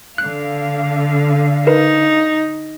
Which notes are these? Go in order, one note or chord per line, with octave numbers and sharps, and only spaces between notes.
D3 F5 F#6
D#4 A#4 B4